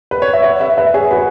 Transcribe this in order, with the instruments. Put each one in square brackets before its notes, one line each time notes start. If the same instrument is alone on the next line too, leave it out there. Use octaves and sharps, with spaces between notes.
[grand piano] B4
C#5
E5
C#5 F#5
B4 E5
B4 E5
G#4 C#5
F#4 B4